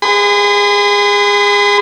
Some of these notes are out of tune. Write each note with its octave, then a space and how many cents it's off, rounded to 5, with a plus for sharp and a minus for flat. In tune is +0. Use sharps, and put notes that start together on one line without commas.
G#4 -25 B5 +45